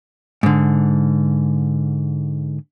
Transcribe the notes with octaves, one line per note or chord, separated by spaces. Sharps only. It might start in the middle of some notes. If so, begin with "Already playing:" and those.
G#2 D3